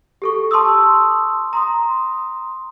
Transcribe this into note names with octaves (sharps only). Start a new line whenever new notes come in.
G4 A4 C#6
A5 C6 C#6 D#6 E6
A#5 C6 D#6